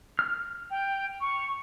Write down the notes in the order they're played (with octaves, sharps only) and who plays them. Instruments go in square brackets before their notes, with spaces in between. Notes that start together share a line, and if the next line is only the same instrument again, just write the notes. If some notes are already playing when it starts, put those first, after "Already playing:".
[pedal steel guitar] F6
[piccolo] G5
C#6